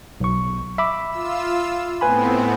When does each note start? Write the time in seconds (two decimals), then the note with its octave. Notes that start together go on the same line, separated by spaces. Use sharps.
0.20 B1 C#6
0.78 E5 B5 D6
1.10 F4 E6
2.01 A2 B3 C4 B4 G#5 B5